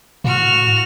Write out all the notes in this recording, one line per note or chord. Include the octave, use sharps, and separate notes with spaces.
A2 F#4 F6